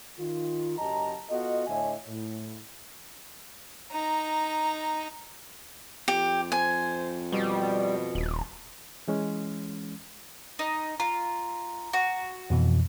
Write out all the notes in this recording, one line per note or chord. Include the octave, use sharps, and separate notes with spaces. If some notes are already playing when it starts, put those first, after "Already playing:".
D#3 F4
F#1 F#2 G4 D#5 A5 A#5
B3 F4 F#4 A4 D#5
A2 D3 C#5 D#5 E5 G#5
A2
D#4 A#5
F2 G4
C5 G#5
B2 G3
D#1
E3 G#3 C#4
D#4
F4 A#5
F#4
F2 B2 E3